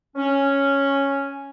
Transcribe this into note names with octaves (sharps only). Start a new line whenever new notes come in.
C#4